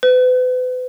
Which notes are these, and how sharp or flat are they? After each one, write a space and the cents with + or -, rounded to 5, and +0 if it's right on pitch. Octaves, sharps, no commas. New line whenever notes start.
B4 +40